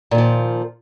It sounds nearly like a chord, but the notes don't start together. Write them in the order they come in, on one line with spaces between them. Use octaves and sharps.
A#2 D#3 F3